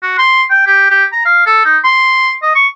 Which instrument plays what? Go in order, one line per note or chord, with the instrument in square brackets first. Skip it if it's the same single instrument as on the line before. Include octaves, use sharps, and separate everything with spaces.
[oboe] F#4
C6
G5
G4
G4
A#5
F5
A4
D#4
C6
D#5
C#6